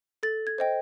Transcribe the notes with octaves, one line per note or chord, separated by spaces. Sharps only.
A4 A6
G#6
C5 D#5 G5